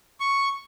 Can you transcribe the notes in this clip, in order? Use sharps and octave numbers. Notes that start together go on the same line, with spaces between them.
C#6